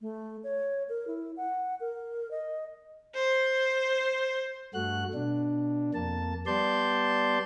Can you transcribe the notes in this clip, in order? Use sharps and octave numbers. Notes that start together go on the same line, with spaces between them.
A3
C#5
A#4
E4
F#5
A#4
D#5
C5
G2 A3 F#4 F#6
B2 D4
F2 A#3 A5
G3 B3 D5 A5 C6 G6